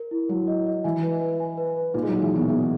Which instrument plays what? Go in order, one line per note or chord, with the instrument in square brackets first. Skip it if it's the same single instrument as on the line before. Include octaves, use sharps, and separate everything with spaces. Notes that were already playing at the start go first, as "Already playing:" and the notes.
Already playing: [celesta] A#4
E4
[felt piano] F#3 [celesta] E4
[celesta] D#5
D#5
[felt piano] E3 [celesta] G#5
[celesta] B4
B4
G#5
B4
B4
[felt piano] A#2 [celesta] D#4
[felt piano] G#3
[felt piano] F#3 [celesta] D#4
[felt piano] E3
[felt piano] B2 [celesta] D#4
[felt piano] E3 [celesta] G#4